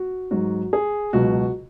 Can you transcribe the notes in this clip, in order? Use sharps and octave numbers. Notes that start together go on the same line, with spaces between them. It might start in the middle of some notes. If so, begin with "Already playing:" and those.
Already playing: F#4
G#2 F#3 F#4
G#4
C#2 B2 F#3 F#4